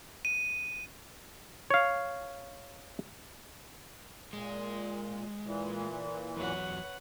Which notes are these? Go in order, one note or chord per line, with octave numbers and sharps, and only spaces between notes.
D#7
C#5 F5
A#2 G#3
A#2 E3
E2 F#3 B4 C#5 F#5